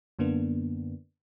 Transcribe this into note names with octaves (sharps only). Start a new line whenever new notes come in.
F#2 D3 A#3 B3 D4